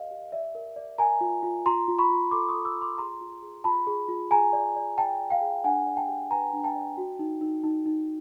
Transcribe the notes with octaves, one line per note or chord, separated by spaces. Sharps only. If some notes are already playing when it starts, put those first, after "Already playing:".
Already playing: G4 A#4 D#5 F5
G4
D5 E5
A#4
D5
A#4 G#5 A#5
F4
F4
F4 A#5 C6
F4
B5 C#6
F4
A4 C6 D6
C#6 D#6
A4
D6 E6
F4
C6 D6
G#4 A#5 C6
F4
G#4
F4 A5 B5
G#4
F4
G#4 G#5 A#5
D5
D5
D5 G5 A5
D5
F5 G5
G#4
D4 F#5 G#5
D5
G5 A5
G4
B4 G#5 A#5
D4
G5 A5
D5
F#4
D#4
D#4
D#4
D#4